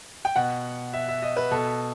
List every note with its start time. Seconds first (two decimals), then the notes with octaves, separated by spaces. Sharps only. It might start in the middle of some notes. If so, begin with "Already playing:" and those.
0.25 G5
0.36 B2 F#5
0.93 E5
1.09 E5
1.22 D#5
1.37 B4
1.51 B2 A4